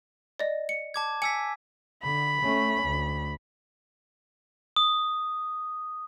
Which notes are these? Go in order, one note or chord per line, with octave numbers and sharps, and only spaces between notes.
D5 D#5
C#7
A5 D6 G#6
G#5 E6 B6 C#7
D3 B5
A3 C#4
D2
D#6